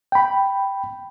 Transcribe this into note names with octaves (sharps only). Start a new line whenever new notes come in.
G5 B5